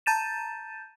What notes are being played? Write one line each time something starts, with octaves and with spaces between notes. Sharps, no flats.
A5 A#5 G6 A6 D#7 E7